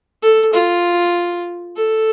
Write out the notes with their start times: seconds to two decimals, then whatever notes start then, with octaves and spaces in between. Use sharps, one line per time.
0.22 A4
0.53 F4
1.76 A4